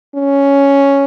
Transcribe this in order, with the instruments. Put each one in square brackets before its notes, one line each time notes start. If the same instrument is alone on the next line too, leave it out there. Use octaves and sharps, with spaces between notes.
[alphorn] C#4